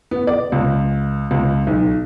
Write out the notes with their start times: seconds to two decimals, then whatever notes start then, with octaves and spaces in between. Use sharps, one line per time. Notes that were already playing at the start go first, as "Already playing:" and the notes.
0.11 B3
0.27 D5
0.52 C#2
1.31 C#2
1.67 B1